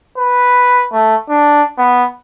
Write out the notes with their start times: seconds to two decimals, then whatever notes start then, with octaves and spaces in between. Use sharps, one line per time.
0.17 B4
0.92 A3
1.29 D4
1.78 B3